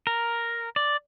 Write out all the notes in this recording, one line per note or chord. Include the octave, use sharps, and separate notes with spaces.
A#4
D5